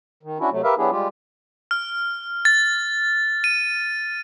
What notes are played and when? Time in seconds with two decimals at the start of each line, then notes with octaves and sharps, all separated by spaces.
0.23 D#3
0.39 C#4 D4 E4 F#4
0.51 C3 F#3 A3
0.64 G4 A#4 B4 E5 F5
0.77 F#3 B3 D4 E4 G4 G#4
0.91 G3 G#3 F4 G4
1.71 F6
2.45 A6
3.44 D#7